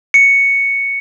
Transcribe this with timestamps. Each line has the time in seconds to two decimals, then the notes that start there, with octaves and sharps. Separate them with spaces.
0.14 C#7